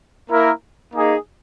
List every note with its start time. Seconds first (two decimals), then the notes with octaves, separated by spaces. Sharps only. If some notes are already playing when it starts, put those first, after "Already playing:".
0.29 A#3 E4 A#4
0.94 A#3 D#4 G#4